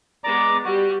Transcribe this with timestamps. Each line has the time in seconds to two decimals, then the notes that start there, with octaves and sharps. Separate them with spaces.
0.24 G#3 B3 D5 A#5 D6
0.65 G3 F#4